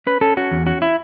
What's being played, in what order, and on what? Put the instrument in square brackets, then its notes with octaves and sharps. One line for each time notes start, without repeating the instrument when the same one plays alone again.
[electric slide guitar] C#4 B4
C#4 A4
C#4 F#4
E2
C#4 F#4
E4